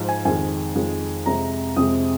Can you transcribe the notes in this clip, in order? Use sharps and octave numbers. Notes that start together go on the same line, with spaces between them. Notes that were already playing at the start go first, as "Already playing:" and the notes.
Already playing: G#2 F3
G#5
F2 D#3 G#3 G#5
F2 D#3 G#3
F2 C3 G#3 A#5
F2 C3 G#3 D#6